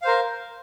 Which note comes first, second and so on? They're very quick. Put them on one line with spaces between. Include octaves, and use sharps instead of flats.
F5 C5 A#4